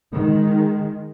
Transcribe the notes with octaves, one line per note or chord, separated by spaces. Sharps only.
D#3 G#3